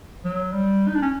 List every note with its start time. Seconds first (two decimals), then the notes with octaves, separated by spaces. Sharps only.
0.25 F#3
0.53 G3
0.88 D#4
0.95 D4
1.02 C#4